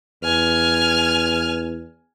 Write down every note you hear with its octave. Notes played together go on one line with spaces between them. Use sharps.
E2 G#5 F6